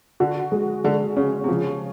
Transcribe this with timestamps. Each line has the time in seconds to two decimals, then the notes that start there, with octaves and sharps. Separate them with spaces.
0.20 D3 F#4
0.52 G#3
0.84 D3 G#3
1.16 C#3 C#4
1.44 C3
1.48 C#3 F3